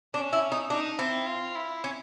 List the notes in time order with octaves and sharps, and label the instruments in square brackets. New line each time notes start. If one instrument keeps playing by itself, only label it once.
[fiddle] C#4 [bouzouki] D4
[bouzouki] E4
D#4
[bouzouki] D4 [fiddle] D#4
[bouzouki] C4 [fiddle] E4
[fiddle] F4
E4
[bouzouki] C#4